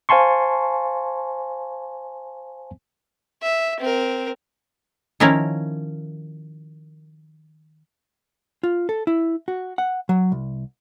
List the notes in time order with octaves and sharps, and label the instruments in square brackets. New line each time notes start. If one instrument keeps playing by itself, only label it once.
[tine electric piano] C5 F5 G#5 A5 C6 C#6
[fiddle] E5
C4 A#4
[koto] D#3 F3 C#4 E4 A#4
[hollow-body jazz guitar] F4
A4
E4
F#4
F#5
F#3
C2